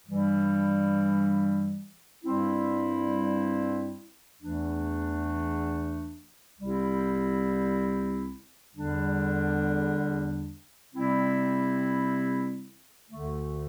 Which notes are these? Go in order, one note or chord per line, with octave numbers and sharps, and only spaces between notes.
G2 E3 G3
G2 G3 C4 E4
E2 E3 A3 D4
C2 C3 G3 C4 E4
E2 D3 G3 D4
C3 G3 C4 E4
D2 D3 A3